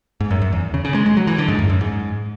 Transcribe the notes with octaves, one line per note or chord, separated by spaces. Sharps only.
G#2
F#2
F#2
E2
C#3
C#3
G#3
G#3
F#3
E3
D3
G#2
F#2
F#2
G#2